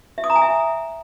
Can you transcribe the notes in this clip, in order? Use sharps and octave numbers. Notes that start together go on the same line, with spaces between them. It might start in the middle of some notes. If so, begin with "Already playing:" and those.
E5
D#6
A#5
G#5
E5